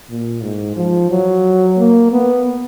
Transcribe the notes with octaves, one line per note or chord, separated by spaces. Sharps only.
A#2
G#2
F3
F#3
A#3
B3